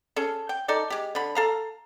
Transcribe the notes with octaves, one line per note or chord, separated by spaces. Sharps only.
C#4 G#4 A4
G5
D#4 A4 D5
G#3 G4
D3 B5
A4 F5 A#5